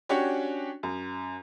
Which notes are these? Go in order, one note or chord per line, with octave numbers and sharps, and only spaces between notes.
C#4 D4 F#4 G4 C#5
F#2